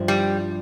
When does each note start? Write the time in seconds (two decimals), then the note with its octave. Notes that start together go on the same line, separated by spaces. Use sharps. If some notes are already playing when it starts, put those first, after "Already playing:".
Already playing: G2 F3 C4 E4
0.08 G3